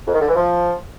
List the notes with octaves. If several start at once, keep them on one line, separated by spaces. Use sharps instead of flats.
F2
D#3
D3
E3
F3